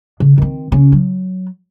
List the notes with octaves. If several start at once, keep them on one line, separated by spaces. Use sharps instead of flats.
C#3
D#3 C4
C#3 C#4
F#3